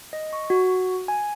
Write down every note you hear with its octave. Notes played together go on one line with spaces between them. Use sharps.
D#5
C#6
F#4
G#5